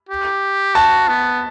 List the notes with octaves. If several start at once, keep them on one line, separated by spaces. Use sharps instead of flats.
G4
F#4 A5
B3